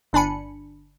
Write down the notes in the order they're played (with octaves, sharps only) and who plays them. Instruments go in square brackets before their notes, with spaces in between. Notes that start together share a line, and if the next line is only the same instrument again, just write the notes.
[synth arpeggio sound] G1 D4 G#5 B5 C#7